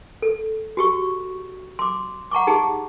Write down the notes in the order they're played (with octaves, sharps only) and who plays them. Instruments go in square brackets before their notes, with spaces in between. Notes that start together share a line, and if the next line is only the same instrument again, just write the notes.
[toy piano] A4
F#4 G4 C#6
C6 D6
F#5 A#5 C#6 D6
D#4 G4 G#4